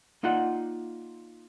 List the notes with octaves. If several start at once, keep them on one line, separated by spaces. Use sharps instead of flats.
A#3 D#4 F4 D5 F#5